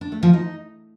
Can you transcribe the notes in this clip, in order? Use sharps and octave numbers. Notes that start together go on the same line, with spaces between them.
D4
A3
F3
D#4